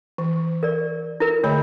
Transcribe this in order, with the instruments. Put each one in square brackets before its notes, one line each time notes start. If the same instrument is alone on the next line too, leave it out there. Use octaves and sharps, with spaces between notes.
[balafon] E3
[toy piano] A#4 D5
E4 A#4
[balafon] D3 A3 B5 [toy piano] C#5